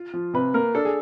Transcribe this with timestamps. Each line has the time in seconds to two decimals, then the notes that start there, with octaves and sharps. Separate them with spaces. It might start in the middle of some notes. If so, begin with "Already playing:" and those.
Already playing: F4
0.13 F3
0.33 C3 B4
0.54 A#3 A#4
0.75 D4 A4
0.85 G#4